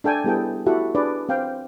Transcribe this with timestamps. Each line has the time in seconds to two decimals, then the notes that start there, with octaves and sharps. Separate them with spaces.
0.04 D4 A4 G5 G#5
0.24 G3 B3 E4 G#4 A4 G5
0.66 E4 F#4 G4 A4 E5 F#5
0.95 D4 G#4 B4 D5
1.29 C4 F5 G5